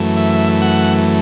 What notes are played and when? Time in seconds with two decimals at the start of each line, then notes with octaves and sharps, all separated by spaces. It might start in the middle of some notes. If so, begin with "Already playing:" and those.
Already playing: F#2 E3 A3
0.17 E5
0.62 F#5